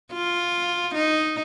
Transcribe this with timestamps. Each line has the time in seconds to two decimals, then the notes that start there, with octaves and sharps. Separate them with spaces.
0.12 F4
0.94 D#4